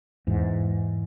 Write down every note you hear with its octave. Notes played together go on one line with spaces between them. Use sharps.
E2 G#2